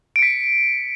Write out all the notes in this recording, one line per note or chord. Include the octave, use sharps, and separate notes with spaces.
B6 C#7 D7